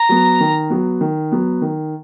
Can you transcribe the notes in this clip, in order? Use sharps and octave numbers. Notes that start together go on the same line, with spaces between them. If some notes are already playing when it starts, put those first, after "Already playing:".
Already playing: A#5
F#3 B3
D#3
F#3 B3
D#3
F#3 B3
D#3